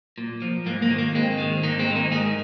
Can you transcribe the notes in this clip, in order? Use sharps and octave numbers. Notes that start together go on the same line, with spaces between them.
A#2
F3
G#2 A#3
A#3
D#3
A#3
G#2 G#3 C4
D#3
G#2 A#3 D#4
G#3 C4
D#3
A#3 D#4
G#2 D#4 G#4